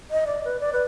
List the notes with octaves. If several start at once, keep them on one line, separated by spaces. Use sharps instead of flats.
D#5
D5
B4
D5
B4